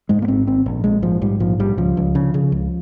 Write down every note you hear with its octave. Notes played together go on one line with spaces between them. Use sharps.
G#2 G#3
A#3
G#1 C4
G#1 C4
A#1
A#1 G#3
G#2 F3
G#2 G3
A#1 F3
A#1 G3
C#2 F3
C#2
C#3
C#3
C#2